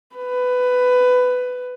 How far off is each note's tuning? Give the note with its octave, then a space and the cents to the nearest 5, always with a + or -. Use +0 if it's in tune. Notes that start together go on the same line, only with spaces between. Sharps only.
B4 +15